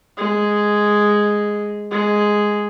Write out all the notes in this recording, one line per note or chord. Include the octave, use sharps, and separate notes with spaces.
G#3
G#3